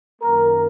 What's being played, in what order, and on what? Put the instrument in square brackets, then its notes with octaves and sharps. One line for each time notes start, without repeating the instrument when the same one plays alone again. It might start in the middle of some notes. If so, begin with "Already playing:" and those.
[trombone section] F#2 D#3 A#3 A#4